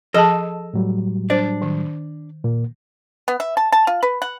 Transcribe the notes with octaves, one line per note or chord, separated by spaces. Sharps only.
F3 G#4 A4 D#5 A5
A2 F#3 G3
D4 C5 D5
D#3
A#2 A#3
B3
E5
A5
A5
F4
B4
F#5